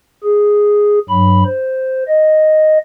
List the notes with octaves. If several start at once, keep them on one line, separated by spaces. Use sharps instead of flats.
G#4
G2 F#3 B5
C5
D#5